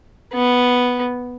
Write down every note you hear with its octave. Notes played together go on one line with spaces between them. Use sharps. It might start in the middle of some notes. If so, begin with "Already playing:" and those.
B3